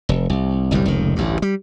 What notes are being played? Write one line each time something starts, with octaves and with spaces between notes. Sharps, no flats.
F1
C2
G1 C2 F#2 G3
F1 C#2 D#3
A1 D2 G2
G3